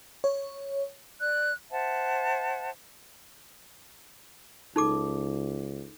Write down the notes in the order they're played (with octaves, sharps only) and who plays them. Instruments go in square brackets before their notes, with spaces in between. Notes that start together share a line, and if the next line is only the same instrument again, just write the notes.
[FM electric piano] C#5
[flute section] D5 F#6
C5 E5 F#5 A5
[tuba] C#2 [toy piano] D#4 A4 D6